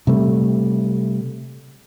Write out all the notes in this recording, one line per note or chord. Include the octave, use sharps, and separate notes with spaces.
C3 G3 A3